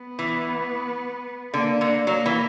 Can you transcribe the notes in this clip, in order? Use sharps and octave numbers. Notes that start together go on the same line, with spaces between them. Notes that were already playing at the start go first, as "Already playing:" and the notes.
Already playing: B3
E3
D3 A#3
D3
F#3 A#3
E3